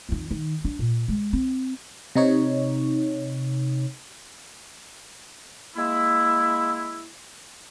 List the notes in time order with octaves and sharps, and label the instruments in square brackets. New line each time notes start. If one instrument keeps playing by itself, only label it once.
[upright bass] F2 D#3
D#3
D4
A#2
G#3
C4
[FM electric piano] C3 D#4 C#5
[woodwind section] G#3 A#3 E4